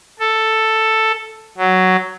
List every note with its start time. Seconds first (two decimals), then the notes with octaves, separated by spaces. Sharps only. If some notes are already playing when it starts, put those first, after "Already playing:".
0.20 A4
1.57 F#3